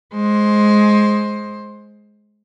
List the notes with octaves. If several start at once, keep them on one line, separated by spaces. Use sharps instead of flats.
G#3 C5